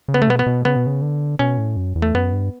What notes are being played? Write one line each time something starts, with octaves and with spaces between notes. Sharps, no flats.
C#3
B3
A3
B2 B3
B3
B2
C#3 B3
B2
C#3
D3
B2 C#4
A2
F#2
E2
A3
F#2 B3
G2